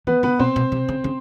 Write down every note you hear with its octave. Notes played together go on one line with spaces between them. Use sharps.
E3 B3 B4
D3 B3 B4
B2 C4 C5
B2
C3
C#3
C#3